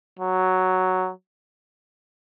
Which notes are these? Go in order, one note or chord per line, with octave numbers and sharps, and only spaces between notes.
F#3